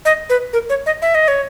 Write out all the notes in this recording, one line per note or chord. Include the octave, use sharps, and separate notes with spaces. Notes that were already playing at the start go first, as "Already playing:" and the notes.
D#5
B4
A#4
C#5
D#5
E5
D#5
C#5